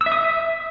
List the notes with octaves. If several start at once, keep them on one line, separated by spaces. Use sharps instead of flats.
E6
E5
D#6
E5